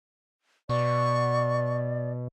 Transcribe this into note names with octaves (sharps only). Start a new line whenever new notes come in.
B2 D5 C#6